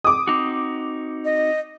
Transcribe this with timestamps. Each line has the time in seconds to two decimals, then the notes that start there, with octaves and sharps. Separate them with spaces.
0.04 D6 D#6
0.27 C4 D#4 F#4
1.25 D#5